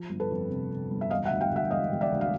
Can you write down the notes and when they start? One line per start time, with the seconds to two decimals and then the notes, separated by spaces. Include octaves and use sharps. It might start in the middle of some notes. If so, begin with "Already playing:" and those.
Already playing: F3
0.09 G1
0.20 A4 B4
0.31 F2
0.50 C3
0.71 C3
0.91 G1
1.01 E5
1.10 E1 D#5 F5
1.25 E5 F#5
1.30 D2
1.41 F5 G5
1.52 D2 E5 F#5
1.71 E1 D#5 F5
1.92 E1
2.01 D5 E5
2.12 D2
2.21 F5